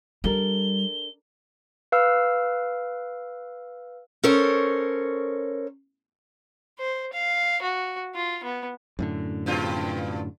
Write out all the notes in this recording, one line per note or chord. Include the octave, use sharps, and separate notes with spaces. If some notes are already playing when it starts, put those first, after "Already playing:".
G3 D4 A4 A#4 G7
B4 F5 E6 F6
C#4 A4 A#4 C5 C#5
C5
F5
F#4
F4
B3
F#2 A2 D3
G2 B2 F4